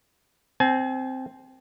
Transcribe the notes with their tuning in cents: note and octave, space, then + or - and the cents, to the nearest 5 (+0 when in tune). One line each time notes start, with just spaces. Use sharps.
C4 -5 G#5 +40